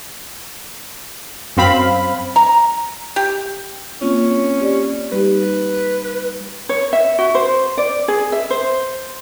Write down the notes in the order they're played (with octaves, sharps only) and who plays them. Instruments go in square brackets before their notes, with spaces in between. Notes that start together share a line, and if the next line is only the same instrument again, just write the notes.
[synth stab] F#2 C4 F5 B5
[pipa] A#5
G4
[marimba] A#3 C4 F4 [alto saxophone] C#4
[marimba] G4 D5
[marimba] G3 D#4 G4 [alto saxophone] B4
[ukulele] C#5
E5
F#4
C5
D5
G#4
E5
C5